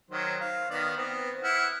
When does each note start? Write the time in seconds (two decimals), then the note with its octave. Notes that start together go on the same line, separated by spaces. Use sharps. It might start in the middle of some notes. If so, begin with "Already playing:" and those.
0.10 D#3 F#3 C5
0.40 F5
0.71 D#3 B3 D5
0.97 B3 C4
1.43 E4 F#5 F6